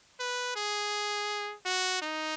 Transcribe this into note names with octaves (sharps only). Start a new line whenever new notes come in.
B4
G#4
F#4
D#4